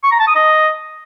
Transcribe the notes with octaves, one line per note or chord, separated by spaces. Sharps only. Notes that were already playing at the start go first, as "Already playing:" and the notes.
C#6
A#5
A5
D#6
D#5